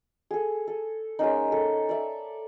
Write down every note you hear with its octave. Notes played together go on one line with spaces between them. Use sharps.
G#4 A4
A4
G#3 A#3 C#4 D#4
A4
D5 E5